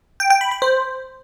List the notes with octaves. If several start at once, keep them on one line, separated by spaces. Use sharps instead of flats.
G5
G5
B5
B5
C5